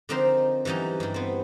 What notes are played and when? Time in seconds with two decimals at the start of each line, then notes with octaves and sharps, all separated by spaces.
0.09 D3 F3 C4 D#4 A#4 C5
0.65 E3 F#3 G3 C#4 D#4
1.00 G2 G3
1.14 B3 C4